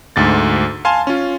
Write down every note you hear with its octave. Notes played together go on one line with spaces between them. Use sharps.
D2 G#2 A6
F5 G#5 A5 C6
C#4 F4